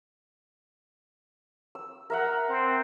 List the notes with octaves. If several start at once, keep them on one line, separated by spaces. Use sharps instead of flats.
E6
A#4 E5 F#5
C4